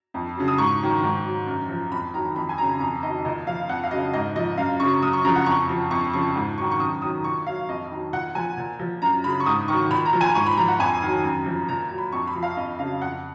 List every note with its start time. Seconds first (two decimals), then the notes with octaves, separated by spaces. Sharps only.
0.14 F2
0.36 C#3 F#3
0.48 D#6
0.58 G#2 C#6
0.81 D#3 F#3
1.03 G#2
1.25 F#3
1.47 F#2
1.69 F3
1.91 F2 B5
2.14 D#3 F#3 A#5
2.36 F2 B5
2.49 G#5
2.58 C#3 F#3 A#5
2.80 F2 A#5
3.03 D#3 D#5
3.07 F#3
3.25 A#2 D#5
3.46 F3 F5
3.69 F2 F#5
3.84 F5
3.91 F#3 D#5
3.94 C#3
4.13 G#2 D#5
4.36 F3 D#5
4.57 F#2 F5
4.80 C#3 F#3 C#6
5.02 F#2 D#6
5.13 C#6
5.24 C#3 F3 A#5
5.36 F#5
5.46 F2 C#6
5.69 F3
5.91 F2 C#6
6.13 C#3 F3 C#6
6.35 G#2
6.58 F#3 C#6
6.61 D#3
6.71 C#6
6.80 F#2 D#6
7.02 D#3 F#3 D#6
7.24 A#2 C#6
7.46 F#3 F5
7.69 F2 D#5
7.91 D#3 F#3
8.13 A#2 F#5
8.35 F3 G#5
8.57 A#2
8.79 F3
9.02 F#2 A#5
9.24 C#3 F#3 B5
9.40 C#6
9.46 G#2 D#6
9.68 D#3 F#3 C#6
9.91 A#2 B5
10.06 A#5
10.13 F3
10.21 G#5
10.35 G#2 C#6
10.46 B5
10.57 F3 A#5
10.68 F#5
10.79 F2 G#5
11.02 D#3 F#3
11.24 F#2
11.46 F3
11.68 A#2 A#5
11.90 F#3
11.98 B5
12.12 F2 C#6
12.27 B5
12.35 F3
12.43 F5
12.57 F2 D#5
12.79 C#3 F#3 F5
13.02 F2 F#5